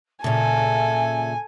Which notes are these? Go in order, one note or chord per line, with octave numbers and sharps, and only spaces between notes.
A#2 C#3 A4 E5 G#5